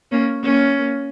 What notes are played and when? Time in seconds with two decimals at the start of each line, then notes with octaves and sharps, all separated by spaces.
0.11 A#3 C#4
0.43 A#3 C#4